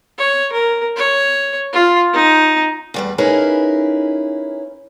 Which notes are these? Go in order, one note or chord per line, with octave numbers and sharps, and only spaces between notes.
C#5
A#4
C#5
F4
D#4
E2 G3 B4
C#4 D#4 E4 G#4 A#4 B4